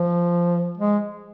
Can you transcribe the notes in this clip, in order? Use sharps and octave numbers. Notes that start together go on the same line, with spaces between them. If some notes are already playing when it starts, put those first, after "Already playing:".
Already playing: F3
G#3